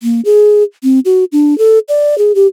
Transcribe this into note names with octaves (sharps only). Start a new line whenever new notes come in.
A#3
G#4
C4
F#4
D4
A4
D5
G#4
G4